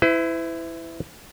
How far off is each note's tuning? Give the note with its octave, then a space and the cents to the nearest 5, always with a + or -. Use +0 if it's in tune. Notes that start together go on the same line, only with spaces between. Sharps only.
E4 +0 B4 +45